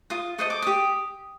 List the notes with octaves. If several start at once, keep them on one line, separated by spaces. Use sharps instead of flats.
F4 D#6
A4 C5 D#5 D#6
D6
G4 D#6